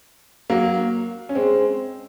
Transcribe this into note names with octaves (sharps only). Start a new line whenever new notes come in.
F#3 A#3
C#4
G#3 C4